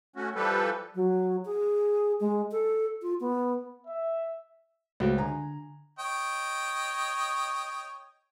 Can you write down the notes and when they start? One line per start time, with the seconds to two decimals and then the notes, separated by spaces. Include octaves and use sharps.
0.16 A3 C#4 F#4
0.35 E3 F3 G3 G4 A4 B4
0.95 F#3
1.45 G#4
2.20 G#3
2.51 A4
3.02 F4
3.21 B3
3.87 E5
5.00 C#2 A3 F#4 C5
5.18 D3 G#5 A#5
5.99 C#5 D#5 G5